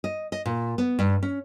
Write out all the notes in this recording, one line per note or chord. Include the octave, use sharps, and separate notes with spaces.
D#5
D#5
A#2
B3
G2
C#4